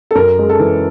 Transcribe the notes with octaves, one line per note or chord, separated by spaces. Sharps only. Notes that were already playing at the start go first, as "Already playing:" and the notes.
A4
F#2 A#4
G#3
A4
E3